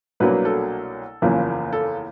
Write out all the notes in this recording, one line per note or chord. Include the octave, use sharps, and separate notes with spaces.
C2 B2 F#3 A#3 D4 B4
A4
F#1 E2 C#3 F3 A#3
A4